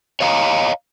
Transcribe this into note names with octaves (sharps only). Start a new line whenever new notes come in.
C#5 D#5 F5 A5 A#5